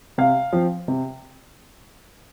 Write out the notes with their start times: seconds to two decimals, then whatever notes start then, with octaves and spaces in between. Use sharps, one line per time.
0.18 C3 F5
0.53 F3 C4
0.88 C3